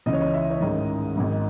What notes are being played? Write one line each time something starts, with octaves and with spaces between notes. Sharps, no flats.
C#2 C#3 E3 D#5
C#5
D#5
E5
C#5
A1 G#2 D#3 D#5
G#1 G#2 D#3